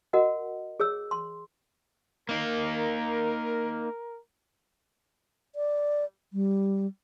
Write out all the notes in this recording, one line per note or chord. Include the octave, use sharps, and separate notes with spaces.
F#4 A#4 D#5 F#5
G#4 C#5 E6
C6
A#3 D#4 A#4
D5
G3